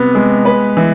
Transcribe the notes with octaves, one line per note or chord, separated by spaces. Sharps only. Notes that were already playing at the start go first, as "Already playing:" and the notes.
Already playing: C3 B3
G#3
B4
E3